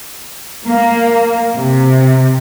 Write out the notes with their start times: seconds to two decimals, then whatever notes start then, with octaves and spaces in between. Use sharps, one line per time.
0.67 A#3
1.55 C3